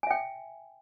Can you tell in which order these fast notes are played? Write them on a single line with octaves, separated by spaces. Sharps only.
G#5 E5 G5